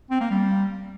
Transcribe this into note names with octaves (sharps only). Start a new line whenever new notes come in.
C4
A#3
G3